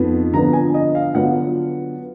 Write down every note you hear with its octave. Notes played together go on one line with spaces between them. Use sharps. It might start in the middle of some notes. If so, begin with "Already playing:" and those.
Already playing: F2 F3 B3 D#4
D3 F3 B3 A#5
G#5
D#5
F5
D3 F#3 B3 D4 F4 F#5